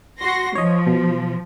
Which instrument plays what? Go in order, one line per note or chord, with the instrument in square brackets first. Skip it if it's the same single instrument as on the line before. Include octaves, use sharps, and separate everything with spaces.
[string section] F#4 C6 A#6
[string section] F3 [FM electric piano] C#5 D#5
[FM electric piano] B2